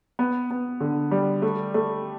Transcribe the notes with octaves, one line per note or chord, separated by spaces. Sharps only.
B3
B3
D3
G3
A3
A3